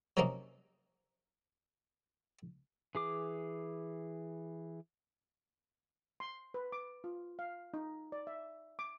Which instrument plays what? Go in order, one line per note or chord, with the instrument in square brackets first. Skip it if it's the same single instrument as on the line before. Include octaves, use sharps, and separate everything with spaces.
[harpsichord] C3 F3 F#3 A#3 C#4 D#4
[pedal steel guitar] E3 G#4 D6
[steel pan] C6
B4
D6
F4
F5
D#4
D5
E5
D6